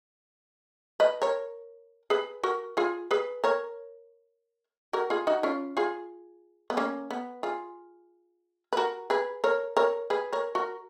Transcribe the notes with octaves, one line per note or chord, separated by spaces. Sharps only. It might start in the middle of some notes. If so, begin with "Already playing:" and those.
B4 D#5
A#4 C#5
G#4 B4
F#4 A#4
F4 G#4
G#4 B4
A#4 C#5
F#4 A#4
F4 G#4
D#4 F#4
C#4 F4
F4 G#4
B3
A#3 C#4
B3
F4 G#4
B4
F#4 A#4
G#4 B4
A#4 C#5
A#4 C#5
G#4 B4
A#4 C#5
F#4 A#4